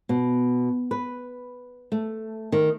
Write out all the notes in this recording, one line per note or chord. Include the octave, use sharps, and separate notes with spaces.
B2
B4
A3
D#3